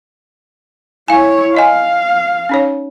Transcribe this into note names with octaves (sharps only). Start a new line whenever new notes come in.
E4 C#5 F5 G#5
E4 D#5 F5 G#5
C#4 D#4 C#5